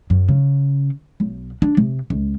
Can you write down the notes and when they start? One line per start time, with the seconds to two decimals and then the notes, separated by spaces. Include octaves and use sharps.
0.10 F#2
0.29 C#3
1.20 B1
1.62 D4
1.77 C3
2.10 C#2